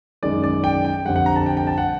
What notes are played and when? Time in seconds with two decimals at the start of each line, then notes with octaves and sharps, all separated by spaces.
0.23 F#2 D#3 G#3 D5
0.44 D5
0.64 G5
0.85 G5
1.05 F2 D3 G3 F#5
1.16 F#5
1.26 A#5
1.36 A5
1.46 G5
1.57 G5
1.67 A5
1.78 F#5